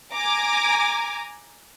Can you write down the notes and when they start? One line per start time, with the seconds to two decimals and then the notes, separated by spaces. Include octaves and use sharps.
0.13 G#5 A#5 D6